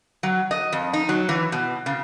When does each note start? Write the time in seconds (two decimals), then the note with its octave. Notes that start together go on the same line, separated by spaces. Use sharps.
0.23 F#3
0.51 D#5
0.72 F2
0.93 D#4
1.09 F#3
1.29 E3
1.52 B2
1.86 C#3